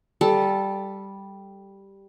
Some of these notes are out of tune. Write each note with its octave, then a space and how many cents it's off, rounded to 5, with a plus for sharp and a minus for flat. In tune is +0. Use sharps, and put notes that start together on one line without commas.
G3 +0 A4 -10